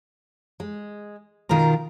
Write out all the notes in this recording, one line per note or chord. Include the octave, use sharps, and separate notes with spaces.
G#3
B2 D#3 F4 A#4 A#5